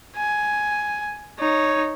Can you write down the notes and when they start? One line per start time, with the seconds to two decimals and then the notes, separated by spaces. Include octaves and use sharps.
0.16 G#5
1.39 D#4 C#5